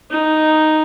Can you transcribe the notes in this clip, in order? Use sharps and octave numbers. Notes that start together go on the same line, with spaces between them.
D#4